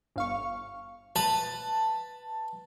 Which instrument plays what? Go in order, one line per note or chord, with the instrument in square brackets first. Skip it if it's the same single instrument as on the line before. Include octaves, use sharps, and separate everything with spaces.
[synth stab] G1 F5 C#6
[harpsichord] B4 [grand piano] A5